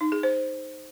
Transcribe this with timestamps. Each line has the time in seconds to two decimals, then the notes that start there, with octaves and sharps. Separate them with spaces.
0.01 D#4
0.12 G#4
0.23 C5